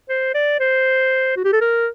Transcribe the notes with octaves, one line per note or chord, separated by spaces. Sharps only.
C5
D5
C5
F#4
G4
A4
A#4